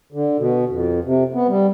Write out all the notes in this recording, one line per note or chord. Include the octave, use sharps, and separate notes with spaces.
D3
B2
F2
C3
B3
G3